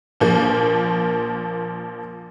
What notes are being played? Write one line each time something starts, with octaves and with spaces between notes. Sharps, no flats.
A#1 F3 A#3